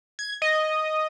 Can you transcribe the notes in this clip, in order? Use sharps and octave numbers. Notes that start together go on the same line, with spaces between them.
G#6
D#5